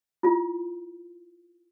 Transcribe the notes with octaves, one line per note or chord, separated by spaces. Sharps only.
E4 F4